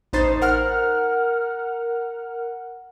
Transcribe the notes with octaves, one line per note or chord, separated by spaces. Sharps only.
A1 D#4 C5 A6 C7
A#4 F#5 F6